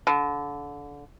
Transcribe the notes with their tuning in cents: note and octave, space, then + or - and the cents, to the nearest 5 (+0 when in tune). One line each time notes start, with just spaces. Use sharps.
D3 -25